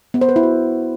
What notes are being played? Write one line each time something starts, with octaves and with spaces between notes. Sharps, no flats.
B3
C5
B4
E4
F#4